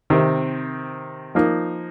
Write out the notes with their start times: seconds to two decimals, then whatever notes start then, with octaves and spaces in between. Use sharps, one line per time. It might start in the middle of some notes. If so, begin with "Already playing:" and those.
0.10 C3 D#3 C4
1.35 F3 A#3 D#4